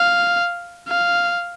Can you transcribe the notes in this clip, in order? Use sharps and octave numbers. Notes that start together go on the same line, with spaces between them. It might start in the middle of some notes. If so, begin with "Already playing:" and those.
Already playing: F5
F5